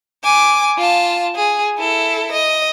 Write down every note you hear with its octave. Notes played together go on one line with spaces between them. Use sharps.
G#5 D6
F4 A5
G#4
E4 A4
D#5